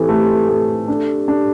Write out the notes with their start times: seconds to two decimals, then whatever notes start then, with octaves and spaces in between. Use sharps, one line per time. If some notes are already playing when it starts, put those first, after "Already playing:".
Already playing: E3 C4 G4 A4
0.09 A3
0.49 A3
0.88 D4
1.28 D4